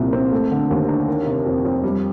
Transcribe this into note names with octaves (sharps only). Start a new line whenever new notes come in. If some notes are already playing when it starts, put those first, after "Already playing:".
Already playing: C2 A#2 F3
C4
A3
D3
D#2
D4
D#3
C3
F2
F2
G3